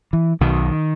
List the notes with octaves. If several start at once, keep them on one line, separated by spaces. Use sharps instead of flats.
E3
B1 B2 D#3